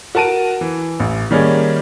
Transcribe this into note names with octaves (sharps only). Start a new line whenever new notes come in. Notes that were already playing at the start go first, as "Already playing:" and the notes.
F#4 A#4 A5 D7 D#7
E3
A1
D#3 G3 A#3 C#4 G#4